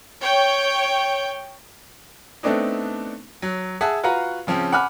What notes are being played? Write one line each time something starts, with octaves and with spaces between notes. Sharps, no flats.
C#5 G5
A3 B3 C4 D4 D#4
F#3
G#4 E5 F#5 A5
F4 F#4 B4 F5 F#5 A#5
C#3 F3 C4 C#4
F#5 G#5 B5 D6 F6